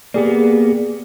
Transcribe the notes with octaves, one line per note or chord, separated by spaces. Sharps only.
A#3 B3 G4 G#4 D5